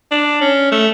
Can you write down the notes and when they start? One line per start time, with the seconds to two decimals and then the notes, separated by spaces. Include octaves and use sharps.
0.11 D4
0.41 C#4
0.72 A3